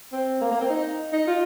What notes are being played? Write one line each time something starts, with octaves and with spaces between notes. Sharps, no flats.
C4
A#3
A#3
C4
D#4
D#4
F4